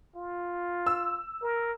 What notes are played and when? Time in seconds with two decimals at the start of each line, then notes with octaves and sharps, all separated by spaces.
0.16 F4
0.86 E6
1.43 A#4